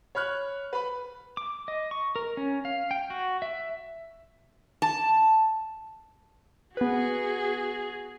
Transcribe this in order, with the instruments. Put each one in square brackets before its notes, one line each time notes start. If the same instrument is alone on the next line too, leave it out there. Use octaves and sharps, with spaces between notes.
[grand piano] C#5 B5 F6 F#6
B4 B5
[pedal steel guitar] D6
D#5
C#6
A#4
C#4
F5
G5
F#4
E5
[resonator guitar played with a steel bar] A5
[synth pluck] B3 B4 [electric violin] F#4 G#4